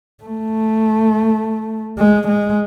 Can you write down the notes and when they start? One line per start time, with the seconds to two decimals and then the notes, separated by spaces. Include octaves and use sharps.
0.24 A3
1.98 G#3
2.28 G#3